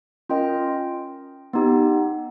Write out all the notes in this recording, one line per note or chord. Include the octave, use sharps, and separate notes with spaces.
C#4 F4 A#4 D#5 G5
B3 D#4 G4